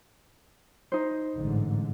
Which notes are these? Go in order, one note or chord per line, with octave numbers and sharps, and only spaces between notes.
D#4 C5
A1 G#2 D3